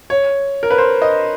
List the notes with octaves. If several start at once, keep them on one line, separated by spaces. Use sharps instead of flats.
C#5
A#4
B4
C5
D#5